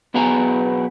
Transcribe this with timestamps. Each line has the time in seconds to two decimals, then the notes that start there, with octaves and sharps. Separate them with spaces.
0.14 B1 B2 B3 G#4 G#5 A#5